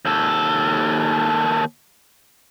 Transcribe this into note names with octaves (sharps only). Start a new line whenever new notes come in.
D#2 A4